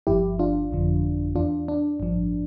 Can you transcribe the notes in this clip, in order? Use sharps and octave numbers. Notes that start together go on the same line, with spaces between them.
G1 G2 F3 E4 G4
D4 F4
G1 F2 D3 F3
E2 E3 D4 F4
D4
A1 G2 F3